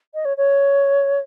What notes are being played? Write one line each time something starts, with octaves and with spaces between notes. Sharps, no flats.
D#5
C#5
C#5